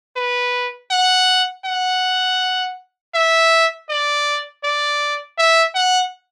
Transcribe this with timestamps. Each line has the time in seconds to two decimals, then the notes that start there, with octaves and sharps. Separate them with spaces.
0.16 B4
0.91 F#5
1.65 F#5
3.14 E5
3.89 D5
4.64 D5
5.38 E5
5.75 F#5